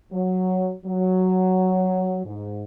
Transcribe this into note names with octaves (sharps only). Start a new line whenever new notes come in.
F#3
F#3
G#2